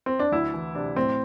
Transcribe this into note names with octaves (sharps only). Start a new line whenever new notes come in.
C4
D4
D2 E4
E3
C3 D4
A2 C4